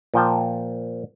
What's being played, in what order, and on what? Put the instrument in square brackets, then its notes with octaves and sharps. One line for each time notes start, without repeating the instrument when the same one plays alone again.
[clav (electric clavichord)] A#2 F3 G5 A5